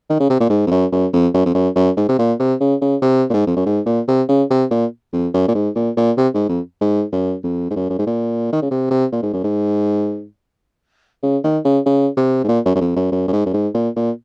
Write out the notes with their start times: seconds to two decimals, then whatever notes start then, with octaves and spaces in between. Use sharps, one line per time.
0.10 D#3
0.20 C#3
0.30 C3
0.40 A#2
0.50 G#2
0.67 F2
0.71 F#2
0.92 F#2
1.13 F2
1.34 F#2
1.46 F2
1.55 F#2
1.76 F#2
1.97 G#2
2.09 C3
2.19 A#2
2.40 C3
2.61 C#3
2.81 C#3
3.02 C3
3.30 A#2
3.34 G#2
3.47 F2
3.56 F#2
3.66 G#2
3.86 A#2
4.08 C3
4.29 C#3
4.50 C3
4.71 A#2
5.13 F2
5.34 F#2
5.48 A#2
5.55 G#2
5.75 A#2
5.97 A#2
6.17 C3
6.34 G#2
6.49 F2
6.81 G#2
7.12 F#2
7.44 F2
7.71 G#2
7.76 F#2
7.89 F#2
7.99 G#2
8.07 A#2
8.52 D#3
8.62 C#3
8.71 C3
8.91 C3
9.12 A#2
9.23 G#2
9.33 F#2
9.44 G#2
11.23 C#3
11.44 D#3
11.65 C#3
11.86 C#3
12.17 C3
12.44 G#2
12.49 A#2
12.65 F#2
12.76 F#2
12.81 F2
12.96 F#2
13.12 F#2
13.28 F#2
13.33 G#2
13.46 F#2
13.53 G#2
13.75 A#2
13.96 A#2